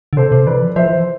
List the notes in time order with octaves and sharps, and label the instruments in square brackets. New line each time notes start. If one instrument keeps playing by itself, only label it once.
[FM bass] D3
[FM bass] C3 [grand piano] A4 C5
[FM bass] C3
[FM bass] E3 [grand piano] B4 D5
[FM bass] F3
[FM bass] F3 [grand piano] C5 E5
[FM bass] E3